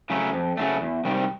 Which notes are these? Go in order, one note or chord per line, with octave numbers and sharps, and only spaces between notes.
C#3 F#3 A3
F2
C#3 F#3 A3
E2
C3 D#3 G3